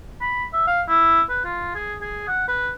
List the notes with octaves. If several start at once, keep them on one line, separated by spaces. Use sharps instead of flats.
B5
E5
F5
E4
B4
F4
G#4
G#4
F#5
B4